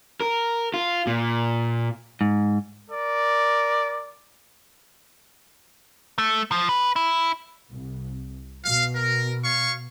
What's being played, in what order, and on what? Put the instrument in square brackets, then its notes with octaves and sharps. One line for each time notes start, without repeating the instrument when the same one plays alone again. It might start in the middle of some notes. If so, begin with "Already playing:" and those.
[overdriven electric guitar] A#4
F4
A#2
[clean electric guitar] G#2
[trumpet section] A#4 D5
[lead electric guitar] A3
F3
B4
E4
[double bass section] C2
[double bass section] B2 [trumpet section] F5
[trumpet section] A#4
C#5 F5 C#6